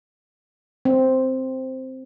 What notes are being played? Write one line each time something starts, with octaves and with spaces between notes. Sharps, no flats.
C4